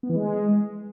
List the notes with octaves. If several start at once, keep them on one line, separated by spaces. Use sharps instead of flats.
B3
E3
G#3